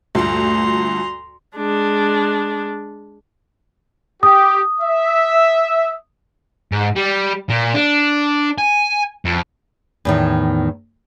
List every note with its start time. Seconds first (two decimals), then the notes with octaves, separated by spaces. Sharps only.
0.15 D2 G2 A#2 G3 A3 A#5 C6
1.56 G#3 D4
4.23 G4 D#6
4.81 E5
6.72 G#2
6.96 G3
7.49 A#2
7.74 D4
8.58 G#5
9.25 F2
10.05 E2 A2 D#3